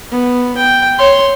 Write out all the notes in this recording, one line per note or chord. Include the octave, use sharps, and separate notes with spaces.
B3
G5
C#5 C6